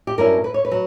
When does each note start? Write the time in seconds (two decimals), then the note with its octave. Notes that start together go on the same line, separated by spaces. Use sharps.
0.07 G4
0.18 G2 F#3 C#4 E4 A#4
0.44 B4
0.54 C#5
0.65 B4
0.71 F#3